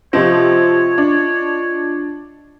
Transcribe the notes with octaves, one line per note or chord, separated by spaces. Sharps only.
C3 F3 C4 F4 C#5 D#5
D4